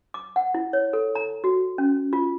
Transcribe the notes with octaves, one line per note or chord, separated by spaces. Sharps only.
D6
F#5
E4
C#5
A4
A#5
F#4
C#4
F4